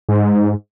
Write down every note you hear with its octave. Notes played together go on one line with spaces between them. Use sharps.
G#2